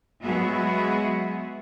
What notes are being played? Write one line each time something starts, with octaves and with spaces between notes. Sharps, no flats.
F#3 G#3 B3 F#4 G#4 E5